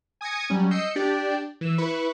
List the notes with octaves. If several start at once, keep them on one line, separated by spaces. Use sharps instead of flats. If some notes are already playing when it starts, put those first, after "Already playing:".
G#5 D#6 G#6 A#6 C#7
F#3 G3 C#4
D#5 E6 G6 C7 C#7
D4 G4 D5
E3 E6
E4 B4 B5 C#6